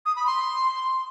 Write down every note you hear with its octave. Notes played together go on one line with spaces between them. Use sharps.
D#6
B5
C6